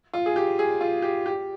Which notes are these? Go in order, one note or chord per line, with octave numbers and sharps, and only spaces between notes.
F4
G#4
G4
G#4
F4
G4
G4